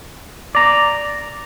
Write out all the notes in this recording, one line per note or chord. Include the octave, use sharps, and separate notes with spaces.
D5 A#5